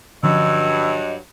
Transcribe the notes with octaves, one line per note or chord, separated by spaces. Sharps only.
G2 D3 F3 F#3 C#4 D#5 E6